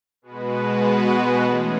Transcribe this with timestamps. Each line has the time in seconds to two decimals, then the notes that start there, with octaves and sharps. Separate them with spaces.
0.22 B2 G#3 B3 F#4 B4
1.41 E3 A3 C#4 G#4